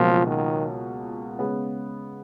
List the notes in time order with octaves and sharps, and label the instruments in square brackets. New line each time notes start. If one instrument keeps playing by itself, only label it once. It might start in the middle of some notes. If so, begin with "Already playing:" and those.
Already playing: [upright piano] C#2 B2 F#3 A#3 F4 [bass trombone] F3
[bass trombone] D#3
[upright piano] C#3 G#3 B3